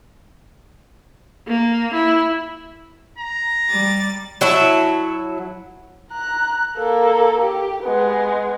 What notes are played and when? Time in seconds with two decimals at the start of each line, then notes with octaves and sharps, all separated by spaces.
1.47 A#3
1.94 E4
3.18 A#5
3.69 G3 A6
4.41 F#3 E4 E5 A5
6.11 A#5 F#6
6.78 A#3 A4
7.42 G4
7.83 G#3 B3